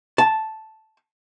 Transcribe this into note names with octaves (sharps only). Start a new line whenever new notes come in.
A5